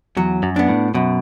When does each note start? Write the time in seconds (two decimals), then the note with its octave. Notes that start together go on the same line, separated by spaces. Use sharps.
0.17 E2 F#3
0.43 F#2
0.56 B3 D4
0.69 A2
0.95 F#2 B2